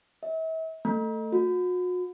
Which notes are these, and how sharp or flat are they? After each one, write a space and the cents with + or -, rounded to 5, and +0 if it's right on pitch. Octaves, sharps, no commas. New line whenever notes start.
E5 -40
A3 +15
F#4 -40